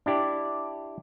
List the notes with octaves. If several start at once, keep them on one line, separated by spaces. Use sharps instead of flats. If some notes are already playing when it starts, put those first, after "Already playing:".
D4 E4 G4 D5